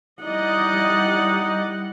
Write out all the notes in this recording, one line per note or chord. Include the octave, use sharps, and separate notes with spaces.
G3 D#4 E4 D5 D#5 F#5